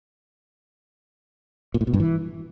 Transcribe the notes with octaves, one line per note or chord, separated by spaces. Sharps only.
A#2
A2
B2
G2
E3